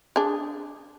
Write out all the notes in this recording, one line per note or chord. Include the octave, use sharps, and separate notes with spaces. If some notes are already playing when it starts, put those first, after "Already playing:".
D4 G#4